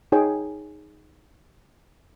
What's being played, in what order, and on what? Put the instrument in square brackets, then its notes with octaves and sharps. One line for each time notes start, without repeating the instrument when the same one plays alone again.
[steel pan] D#4 G#4 C#5 G5